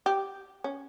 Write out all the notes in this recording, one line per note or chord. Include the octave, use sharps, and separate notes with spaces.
G4
C#4